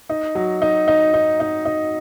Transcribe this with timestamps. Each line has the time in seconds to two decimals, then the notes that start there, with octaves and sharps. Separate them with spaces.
0.09 D#4
0.35 F#3
0.62 D#4
0.88 D#4
1.14 D#4
1.40 D#4
1.65 D#4